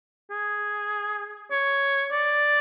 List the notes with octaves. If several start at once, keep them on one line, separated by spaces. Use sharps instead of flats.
G#4
C#5
D5